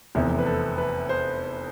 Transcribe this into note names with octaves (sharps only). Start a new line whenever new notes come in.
F1 E2 C3
B4
A4
B4
C5